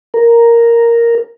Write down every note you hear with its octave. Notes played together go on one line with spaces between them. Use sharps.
A#4